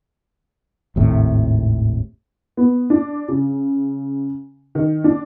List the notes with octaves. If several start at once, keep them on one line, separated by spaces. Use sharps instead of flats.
G#1 D#2 A2 C3
B3
D4
C#3
D#3
D4